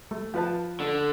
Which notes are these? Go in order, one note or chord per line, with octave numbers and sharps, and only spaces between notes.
A3
F3 B4 A5
D3